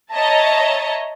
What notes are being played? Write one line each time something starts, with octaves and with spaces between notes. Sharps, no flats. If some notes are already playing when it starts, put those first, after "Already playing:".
C#5 D#5 E5 A5 A#5